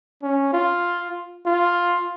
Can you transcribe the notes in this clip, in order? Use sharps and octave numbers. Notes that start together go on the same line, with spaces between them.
C#4
F4
F4